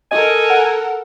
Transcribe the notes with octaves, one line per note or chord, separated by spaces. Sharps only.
A4 A#4 D#5 G#5
F#5